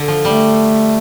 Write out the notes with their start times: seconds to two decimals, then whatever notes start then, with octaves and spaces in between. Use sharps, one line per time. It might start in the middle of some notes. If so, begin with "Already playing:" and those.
Already playing: D3
0.08 F3
0.24 G3 A3